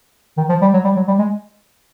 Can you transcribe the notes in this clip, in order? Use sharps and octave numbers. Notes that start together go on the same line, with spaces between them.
D#3
F3
G3
F#3
G3
F#3
G3
G#3